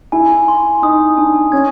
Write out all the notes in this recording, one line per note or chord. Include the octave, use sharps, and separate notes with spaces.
E4 G#5
C6
D#4 D#6
D4 G#5
C#4 G#6